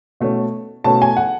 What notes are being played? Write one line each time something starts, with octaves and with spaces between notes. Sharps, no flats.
B2 A3 C#4
B2 A3 C#4 A5
G#5
F#5